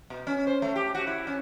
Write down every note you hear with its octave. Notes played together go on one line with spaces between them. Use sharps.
B2
C#4
C5
A3
G4
F#4
E4
C#4